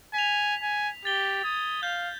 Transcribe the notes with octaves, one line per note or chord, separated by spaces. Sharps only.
G#5 B6 F7
G#5
G4 A6 G7
D#6 G#6
F5 G6